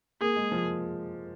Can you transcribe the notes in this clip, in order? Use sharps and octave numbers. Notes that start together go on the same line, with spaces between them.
A#3 G#4
G#3
F3